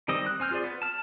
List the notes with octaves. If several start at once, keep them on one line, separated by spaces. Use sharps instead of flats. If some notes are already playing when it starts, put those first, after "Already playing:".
D#3 G3 C4 D#5
F#6
C4 G#5 F6 G6
F4 G#4 C5 D5
B3
A5 F6